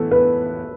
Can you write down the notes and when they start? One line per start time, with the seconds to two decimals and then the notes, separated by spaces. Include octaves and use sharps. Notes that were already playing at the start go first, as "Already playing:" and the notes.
Already playing: A2 E3 B3 A4
0.11 B4